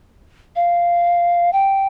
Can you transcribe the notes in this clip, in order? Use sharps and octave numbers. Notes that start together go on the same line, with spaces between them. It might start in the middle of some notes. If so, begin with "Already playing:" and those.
F5
G5